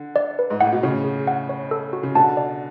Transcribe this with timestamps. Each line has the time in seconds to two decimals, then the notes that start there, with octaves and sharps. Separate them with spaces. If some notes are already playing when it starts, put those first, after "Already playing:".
Already playing: D3
0.16 D5
0.39 B4
0.50 G#2
0.61 A2 F#5
0.72 B2
0.83 A2 C#3 C#5
1.04 G#4
1.28 F#5
1.49 C#5
1.71 A4
1.93 F#4
2.03 C#3
2.15 B2 D3 A5
2.37 D5